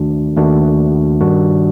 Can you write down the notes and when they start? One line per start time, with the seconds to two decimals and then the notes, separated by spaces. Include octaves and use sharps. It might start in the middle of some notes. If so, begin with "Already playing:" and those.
Already playing: D#2 D#3 A3 D4 F#4
0.37 D#2 D#3 A3 D4 F#4
1.20 G2 D#3 G3 D4 F#4